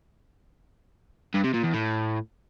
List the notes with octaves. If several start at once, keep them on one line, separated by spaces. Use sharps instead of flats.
G2
C3
A#2
E2
A2